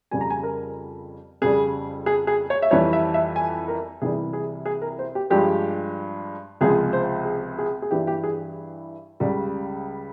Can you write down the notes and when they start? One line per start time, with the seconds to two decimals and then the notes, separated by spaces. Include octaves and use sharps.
0.11 F2 C#3 G3 G#5
0.21 A#5
0.30 G#5
0.43 A#4
1.42 F2 C#3 G3 G#4
2.06 G#4
2.27 G#4
2.50 C#5
2.62 E5
2.71 F2 E3 G3 C#5
2.93 E5
3.14 E5
3.36 G#5
3.68 A#4
4.02 C2 C3 E3 G3 G#4
4.33 G#4
4.66 G#4
4.82 A#4
4.99 C5
5.15 G4
5.30 G2 F3 G#3 G4
6.61 C#2 C3 F3 G#3 G#4
6.93 C5
7.25 G#4
7.59 G#4
7.82 G#4
7.91 G2 E3 G3 G4
8.07 G4
8.24 G#4
9.20 C#2 C#3 G3